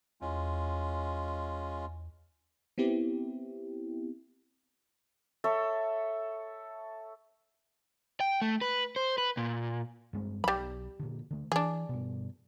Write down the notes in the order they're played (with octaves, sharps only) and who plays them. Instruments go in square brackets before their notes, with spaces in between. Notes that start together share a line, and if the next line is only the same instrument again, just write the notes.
[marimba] E2 [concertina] G#3 C#4 F4
[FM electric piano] B3 C4 E4 G4
[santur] A4 C#5 E5
[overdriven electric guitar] G5
A3
B4
C5
B4
A#2
[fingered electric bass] G2 G#3 C4
[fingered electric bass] B1 F#3 [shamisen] G3 B5
[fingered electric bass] A#2 D3
D3 A3
[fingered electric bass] E3 [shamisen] D4 G#4
[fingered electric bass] G2 B2